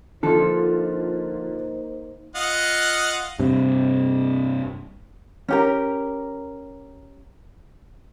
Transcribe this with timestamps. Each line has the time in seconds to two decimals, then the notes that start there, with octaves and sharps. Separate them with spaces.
0.23 D3 F3 A#3 D#4 F4 A4 C5
2.35 F4 D#5 F#5
3.39 G2 C3
5.48 C#4 G4 A#4